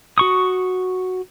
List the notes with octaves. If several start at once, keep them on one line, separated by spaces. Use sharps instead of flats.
F#4 C#6 D#6